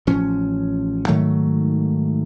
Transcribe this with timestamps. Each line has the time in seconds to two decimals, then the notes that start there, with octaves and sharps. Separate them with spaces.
0.07 A1 F3 C#4
1.08 G#2 D#3 F#3 A3